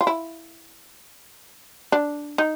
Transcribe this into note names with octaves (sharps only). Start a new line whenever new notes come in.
F4
E4
D4
D#4